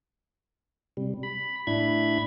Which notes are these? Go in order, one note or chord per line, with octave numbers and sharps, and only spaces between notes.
C3 G3
B5
A2 D4 E4 B5 G#6